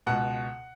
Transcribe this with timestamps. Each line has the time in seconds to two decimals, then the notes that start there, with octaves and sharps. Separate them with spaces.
0.07 C#2 B2 F#5